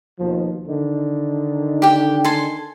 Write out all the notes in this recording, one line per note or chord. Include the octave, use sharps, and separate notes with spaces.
D#2 B2 F3
D3 D#3 D#4
G4 G5
A4 G#5 C6